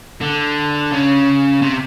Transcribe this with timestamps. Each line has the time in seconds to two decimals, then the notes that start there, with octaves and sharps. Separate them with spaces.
0.21 D3
0.92 C#3
1.62 C3